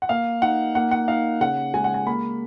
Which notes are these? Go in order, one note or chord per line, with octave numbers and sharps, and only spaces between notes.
F#5
A#3 F5
D#4 F#5
A#3 F#5
F#5
D#4 F5
C#3 F#5
G#3 G#5
F#5
G#5
A#3 B5